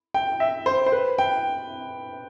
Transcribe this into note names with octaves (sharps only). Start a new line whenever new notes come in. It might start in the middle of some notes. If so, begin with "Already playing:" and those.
G5
E5
C5
C5
B4
G5